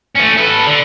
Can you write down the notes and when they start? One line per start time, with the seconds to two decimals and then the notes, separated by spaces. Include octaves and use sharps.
0.15 A3 C#4
0.38 A4 B4
0.67 D3